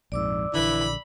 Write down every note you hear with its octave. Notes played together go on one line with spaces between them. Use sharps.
A#1 F2 G#2 D5 D6 E6
A#1 D3 E3 B5